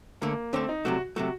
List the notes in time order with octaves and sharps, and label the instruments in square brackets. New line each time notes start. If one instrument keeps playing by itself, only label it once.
[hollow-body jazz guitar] D2 D3 A3 [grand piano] A#3
[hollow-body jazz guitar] D2 D3 A3 [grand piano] C4
[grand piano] D#4
[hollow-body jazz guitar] C2 C3 F#3 A3 [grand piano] F#4
[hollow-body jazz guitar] C3 F#3 A3 [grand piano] F#4